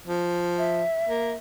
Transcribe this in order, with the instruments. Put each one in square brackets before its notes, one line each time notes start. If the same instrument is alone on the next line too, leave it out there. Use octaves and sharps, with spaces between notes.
[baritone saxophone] F3
[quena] E5
[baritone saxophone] A#3